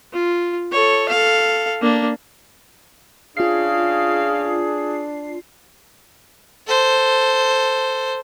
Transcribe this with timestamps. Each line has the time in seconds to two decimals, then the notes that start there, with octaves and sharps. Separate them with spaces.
0.13 F4
0.72 A4 C#5
1.09 A4 F5
1.82 A#3 D4
3.37 C#3 D4 F4 G#4 F5 C7
6.67 A4 C5